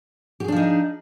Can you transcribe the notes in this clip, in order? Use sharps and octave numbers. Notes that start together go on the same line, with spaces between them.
F3 D4 D#4 G4 G#4